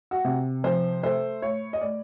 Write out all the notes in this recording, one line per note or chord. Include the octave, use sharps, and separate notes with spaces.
F#4
C3
F3 C5
A3 C5
A2 C#5
D#5
A2 D5